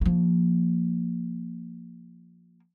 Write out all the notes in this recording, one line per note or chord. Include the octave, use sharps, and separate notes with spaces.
F3 A#3